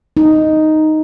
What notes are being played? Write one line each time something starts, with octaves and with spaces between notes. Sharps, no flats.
D#4